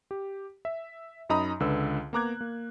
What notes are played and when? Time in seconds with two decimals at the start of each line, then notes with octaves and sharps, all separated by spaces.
0.11 G4
0.65 E5
1.29 F#2 D#4 D#5 A#5 B5 D#6
1.60 C#2 D3 B4 E6
2.13 A#3 B3 A#5 D6 F#6 G#6
2.41 A#3